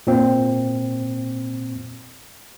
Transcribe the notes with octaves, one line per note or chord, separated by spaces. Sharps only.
A#2 C4